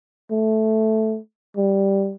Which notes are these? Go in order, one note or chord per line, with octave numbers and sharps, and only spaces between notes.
A3
G3